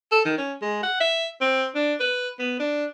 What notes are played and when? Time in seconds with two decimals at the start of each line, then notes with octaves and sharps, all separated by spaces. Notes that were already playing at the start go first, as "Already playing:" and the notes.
0.12 A4
0.25 D#3
0.38 C#4
0.62 G#3
0.83 F#5
1.00 E5
1.41 C4
1.75 D4
2.00 B4
2.39 B3
2.60 D4